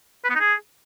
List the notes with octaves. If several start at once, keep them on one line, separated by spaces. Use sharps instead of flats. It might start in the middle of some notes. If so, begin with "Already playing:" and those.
B4
B3
D#4
G#4